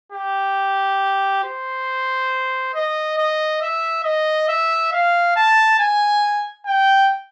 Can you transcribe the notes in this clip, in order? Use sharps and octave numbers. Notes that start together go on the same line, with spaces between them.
G4
C5
D#5
D#5
E5
D#5
E5
F5
A5
G#5
G5